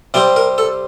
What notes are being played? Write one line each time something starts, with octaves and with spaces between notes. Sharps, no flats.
C3 G3 C4 D5
A#4
A4